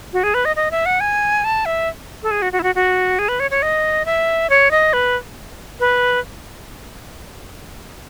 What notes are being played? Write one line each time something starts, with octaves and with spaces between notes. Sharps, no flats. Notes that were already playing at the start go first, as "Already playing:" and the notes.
F#4
G#4
B4
D#5
D#5
E5
F#5
G#5
A5
E5
A4
G#4
F#4
F#4
E4
F#4
F#4
G#4
B4
C#5
C#5
D#5
E5
C#5
D#5
B4
B4